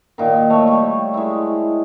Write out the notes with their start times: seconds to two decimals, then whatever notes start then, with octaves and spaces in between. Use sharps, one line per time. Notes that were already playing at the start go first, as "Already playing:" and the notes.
0.18 A#2 D#3
0.50 A3 C#5
0.68 G3
1.14 G#3 E4